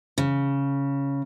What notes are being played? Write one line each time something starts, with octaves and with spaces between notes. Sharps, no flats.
C#3